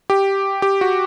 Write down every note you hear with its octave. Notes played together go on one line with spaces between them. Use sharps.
G4
G4
F#4